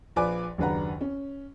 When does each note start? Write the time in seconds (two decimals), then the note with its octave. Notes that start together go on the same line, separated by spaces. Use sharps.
0.16 A#1 F4 B4 D5 G#5 D6
0.58 F#1 D#2 D4 B4 F#5 A#5
1.01 C#4